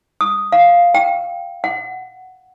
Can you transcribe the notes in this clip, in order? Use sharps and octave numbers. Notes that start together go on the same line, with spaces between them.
D#6
F5
G5
F#5